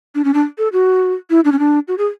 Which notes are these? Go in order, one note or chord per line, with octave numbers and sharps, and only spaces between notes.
D4
C#4
D4
A4
F#4
E4
D4
C#4
D4
F#4
G#4